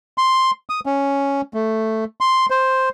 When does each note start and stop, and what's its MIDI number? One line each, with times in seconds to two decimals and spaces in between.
0.18 0.51 84
0.70 0.80 87
0.86 1.41 61
1.54 2.04 57
2.21 2.46 84
2.50 2.89 72